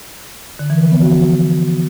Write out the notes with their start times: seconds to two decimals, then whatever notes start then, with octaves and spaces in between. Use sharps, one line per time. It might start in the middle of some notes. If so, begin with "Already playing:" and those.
0.59 D3
0.70 E3
0.80 F3
0.91 B3
1.02 F#4